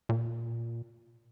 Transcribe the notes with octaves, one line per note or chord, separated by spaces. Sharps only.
A#2